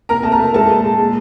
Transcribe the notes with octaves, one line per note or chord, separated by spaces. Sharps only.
C3 A#4 A#5
A3 A5
A#4 A#5
A3
G#3 A4 A5
A#2
G#3
A#2